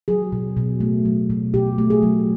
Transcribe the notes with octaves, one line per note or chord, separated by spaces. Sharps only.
F#3 G#4
B2
B2
A3
F#3
B2
B2 G4
A3
G#4
F#3